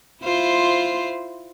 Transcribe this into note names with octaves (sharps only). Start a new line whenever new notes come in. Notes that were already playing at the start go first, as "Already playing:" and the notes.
E4 F4 C5